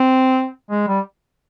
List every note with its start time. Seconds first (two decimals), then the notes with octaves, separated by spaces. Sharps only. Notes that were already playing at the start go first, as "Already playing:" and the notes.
Already playing: C4
0.71 G#3
0.88 G3